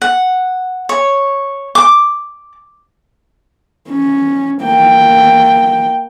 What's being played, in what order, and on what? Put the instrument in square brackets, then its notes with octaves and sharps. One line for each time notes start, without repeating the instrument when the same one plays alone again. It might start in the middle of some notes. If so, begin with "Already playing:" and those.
[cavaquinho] F#5
C#5
D6
[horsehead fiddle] C#4
A#3 G5